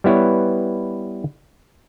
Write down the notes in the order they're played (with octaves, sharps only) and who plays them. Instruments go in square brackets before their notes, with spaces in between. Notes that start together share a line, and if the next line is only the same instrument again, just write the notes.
[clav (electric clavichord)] G3 B3 E4 B4 C#5